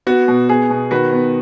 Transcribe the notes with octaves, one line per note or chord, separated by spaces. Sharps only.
B3 F#4
B2
B3 G#4
B2
D#3 F#4 B4
B3